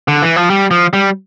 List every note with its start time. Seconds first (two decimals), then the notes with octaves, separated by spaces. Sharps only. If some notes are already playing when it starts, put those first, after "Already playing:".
0.08 D3
0.22 E3
0.36 F3
0.50 G3
0.71 F3
0.93 G3